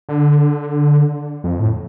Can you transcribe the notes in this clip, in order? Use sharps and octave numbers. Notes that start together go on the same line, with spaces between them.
D3
F2
A2